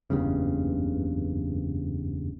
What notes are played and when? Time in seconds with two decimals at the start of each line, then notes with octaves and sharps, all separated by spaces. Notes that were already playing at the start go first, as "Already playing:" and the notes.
0.10 F#1 E2 G2 C#3